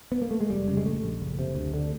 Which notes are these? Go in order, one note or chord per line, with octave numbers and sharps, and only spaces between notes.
B3
A#3
A3
G#3
F1 G3
C#3
G#3
A#1 A3
A#1
F#1
C3
D2
D3